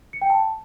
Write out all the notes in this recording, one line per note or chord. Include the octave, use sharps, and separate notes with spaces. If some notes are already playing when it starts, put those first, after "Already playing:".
C#7
G5
A5